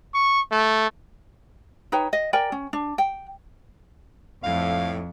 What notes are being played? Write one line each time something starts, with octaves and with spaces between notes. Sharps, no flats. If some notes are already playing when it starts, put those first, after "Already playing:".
C#6
A3
D#4 B4 C#5 G5
D#5
A#4 D5 G5 G#5
C#4
D4
G5
F2 A2 F5